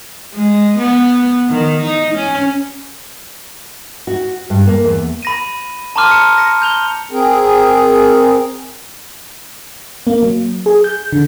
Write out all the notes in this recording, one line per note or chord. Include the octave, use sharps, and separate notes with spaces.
G#3
B3
D#3
D#4
C#4
F#4
G2
A#3
E2
B5 A#6 D#7
A5 A#5 C6 D6 F6 D#7
C#7 E7
A#6 C#7
G6 F7 G7
C4 G#4 A#4
A#3
F#3
G#4
G6
D3